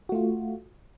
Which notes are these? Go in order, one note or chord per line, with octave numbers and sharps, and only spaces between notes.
A3 F4 F#4